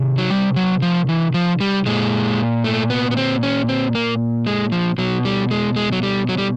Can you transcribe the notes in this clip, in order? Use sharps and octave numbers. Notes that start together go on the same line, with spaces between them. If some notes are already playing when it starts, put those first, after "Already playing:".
Already playing: C3 D#3
F#3
G3
F#3
F3
E3
F3
G3
A#2 G#3
A3
B3
B3
C4
C#4
C4
A#3
G#3
F3
B2 F#3
G3
G#3
G#3
F#3
G3
F#3
G3